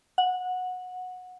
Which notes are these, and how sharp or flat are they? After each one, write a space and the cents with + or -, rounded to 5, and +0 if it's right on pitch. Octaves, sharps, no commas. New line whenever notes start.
F#5 -15